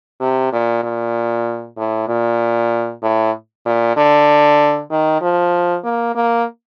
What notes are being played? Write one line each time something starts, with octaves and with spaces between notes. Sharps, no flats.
C3
A#2
A#2
A2
A#2
A2
A#2
D3
D#3
F3
A#3
A#3